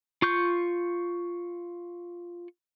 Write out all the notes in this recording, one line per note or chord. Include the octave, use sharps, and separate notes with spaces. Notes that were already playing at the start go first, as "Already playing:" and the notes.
F4 C#6 G6